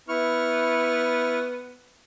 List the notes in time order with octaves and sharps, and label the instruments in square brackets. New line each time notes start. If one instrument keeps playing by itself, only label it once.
[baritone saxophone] B3 [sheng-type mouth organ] E4 C#6 F6